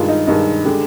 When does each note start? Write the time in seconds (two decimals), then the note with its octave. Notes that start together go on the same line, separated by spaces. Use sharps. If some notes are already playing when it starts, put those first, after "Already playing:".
Already playing: G2 D#3 G#3 F4
0.08 D#4
0.27 G2 D#3 G#3 D#4
0.65 D3 G#3 G4